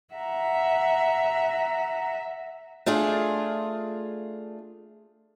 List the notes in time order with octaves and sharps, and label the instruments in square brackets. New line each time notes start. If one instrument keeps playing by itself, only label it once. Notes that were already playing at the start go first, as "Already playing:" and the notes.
[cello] E5 [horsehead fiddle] F#5 A#5
[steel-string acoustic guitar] A3 D4 F4 G#4